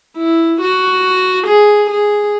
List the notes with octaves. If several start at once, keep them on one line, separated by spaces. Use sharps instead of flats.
E4
F#4
G#4
G#4